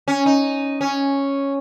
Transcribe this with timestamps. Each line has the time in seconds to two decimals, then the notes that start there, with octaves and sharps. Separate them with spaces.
0.08 C#4
0.26 D#4
0.81 C#4